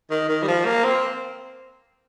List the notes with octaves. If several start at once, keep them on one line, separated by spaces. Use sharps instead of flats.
D#3
D#3
G3
F3
A#3
C4